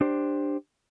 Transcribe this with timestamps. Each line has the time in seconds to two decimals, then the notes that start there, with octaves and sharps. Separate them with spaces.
0.01 D4 G4 C5